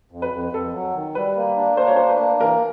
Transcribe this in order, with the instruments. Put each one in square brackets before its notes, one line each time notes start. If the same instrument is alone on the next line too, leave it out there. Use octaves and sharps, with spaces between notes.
[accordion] F2
[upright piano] B4
[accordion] F2
[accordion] F2 [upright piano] A4
[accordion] F#3
D#3
[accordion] G3 [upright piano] B4
[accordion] A#3
D4
[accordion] A#3 [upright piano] C5
[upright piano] C#5
[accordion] D4 [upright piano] C5
[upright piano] B4
[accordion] A#3
[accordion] E3 [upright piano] A#4